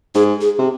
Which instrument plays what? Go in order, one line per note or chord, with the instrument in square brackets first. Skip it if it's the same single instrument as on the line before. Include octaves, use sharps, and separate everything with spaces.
[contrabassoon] G#2 [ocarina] G#4
[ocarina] G#4
[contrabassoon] C3